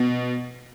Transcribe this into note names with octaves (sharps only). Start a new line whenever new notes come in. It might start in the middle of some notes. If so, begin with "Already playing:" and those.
Already playing: B2